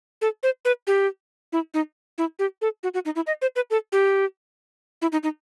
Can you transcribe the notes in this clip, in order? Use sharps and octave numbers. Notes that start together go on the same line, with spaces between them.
A4
C5
B4
G4
E4
D#4
E4
G4
A4
F#4
F#4
D#4
E4
D#5
C5
B4
A4
G4
E4
D#4
D#4